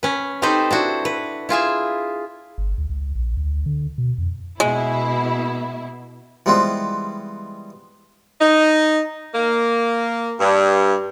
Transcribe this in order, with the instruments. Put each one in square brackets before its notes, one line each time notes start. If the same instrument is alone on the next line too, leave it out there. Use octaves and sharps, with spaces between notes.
[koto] C#4 B4
C4 D#4 G4 A4 B4 C5
D4 E4 F#4
B4
E4 F4 G#4 E5
[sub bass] G1
D2
C#2
A#1
D2
D3
B2
F2
[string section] B2 E4 [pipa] G#3
[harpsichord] E3 G3 G#3 B3 C4 F4
[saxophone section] D#4
A#3
G2